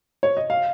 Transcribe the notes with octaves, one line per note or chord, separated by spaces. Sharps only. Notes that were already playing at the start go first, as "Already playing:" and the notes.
C#5
D#5
F5